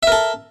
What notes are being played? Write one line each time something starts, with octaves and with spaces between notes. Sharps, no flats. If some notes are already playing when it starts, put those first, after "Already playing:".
A4 A#4 E5